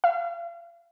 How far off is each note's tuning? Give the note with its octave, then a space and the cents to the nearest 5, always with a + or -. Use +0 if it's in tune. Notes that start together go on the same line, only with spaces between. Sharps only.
F5 -40